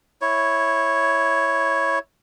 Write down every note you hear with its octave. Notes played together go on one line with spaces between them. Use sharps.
E4 C#5